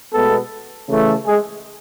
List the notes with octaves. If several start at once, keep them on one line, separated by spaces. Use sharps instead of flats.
B2 G#3 A3 B3 A4
C#3 E3 A3
G#3 G#4